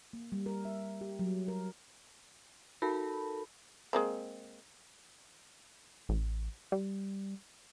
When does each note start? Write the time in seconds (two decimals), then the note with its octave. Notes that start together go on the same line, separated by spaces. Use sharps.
0.13 A#3
0.32 G3
0.46 A#4
0.65 E5
1.01 G4
1.19 F#3
1.48 A#4
2.82 D#4 F#4 A4 A#4 A5 B5
3.93 G#3 A#3 C4
6.09 A1
6.72 G3